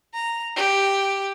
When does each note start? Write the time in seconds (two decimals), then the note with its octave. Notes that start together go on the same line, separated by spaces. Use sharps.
0.14 A#5
0.56 G4